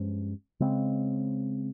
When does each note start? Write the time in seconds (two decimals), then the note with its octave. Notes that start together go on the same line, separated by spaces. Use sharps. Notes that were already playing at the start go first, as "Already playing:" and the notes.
Already playing: G2 F3 G#3 C#4
0.60 C#3 G#3 C4